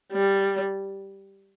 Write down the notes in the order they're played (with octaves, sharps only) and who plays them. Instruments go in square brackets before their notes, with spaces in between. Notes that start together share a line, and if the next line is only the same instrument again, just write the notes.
[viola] G3